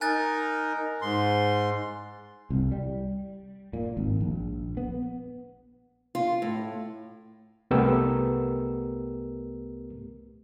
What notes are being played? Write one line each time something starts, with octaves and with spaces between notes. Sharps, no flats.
D#4 A#4 G#5 F#6 A6
G#2 C6
C2
G3
A#2
G#1
A#1
B3
F4
A2
C2 A3 B3 G4 A#4 E6